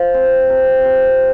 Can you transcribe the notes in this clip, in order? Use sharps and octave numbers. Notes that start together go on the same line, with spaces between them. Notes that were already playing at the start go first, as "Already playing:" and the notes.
Already playing: F3
C4
C3
C3